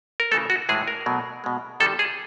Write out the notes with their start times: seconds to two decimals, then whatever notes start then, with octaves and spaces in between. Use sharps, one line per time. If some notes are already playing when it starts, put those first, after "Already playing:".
0.20 A#4
0.31 C#3 E3 A3 A4
0.50 F#4
0.69 A2 E3 G#3 G#4
0.88 A#4
1.06 B2 F#3 A3
1.44 B2 G#3
1.80 C3 D#3 G3 A4
1.99 G#4